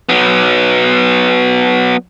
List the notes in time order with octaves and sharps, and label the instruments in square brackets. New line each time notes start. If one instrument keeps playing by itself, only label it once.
[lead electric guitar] F#3 B3